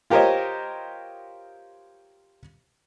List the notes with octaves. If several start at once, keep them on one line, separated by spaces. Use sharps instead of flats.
F4 G4 A#4 C5 C#5 D#5